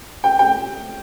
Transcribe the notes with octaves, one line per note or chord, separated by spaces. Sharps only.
G5
G5